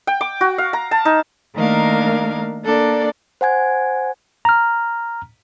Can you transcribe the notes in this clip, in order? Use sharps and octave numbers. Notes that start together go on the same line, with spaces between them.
G5
D6
F#4
F5
A#5
A5
D#4
D#3 A3 A#3 D4 A#4 F5
A#3 D4 A4 D5
C5 F#5 G#5 G#6
A#5 F6